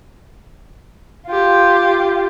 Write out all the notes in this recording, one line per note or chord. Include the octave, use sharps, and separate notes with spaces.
F4 G4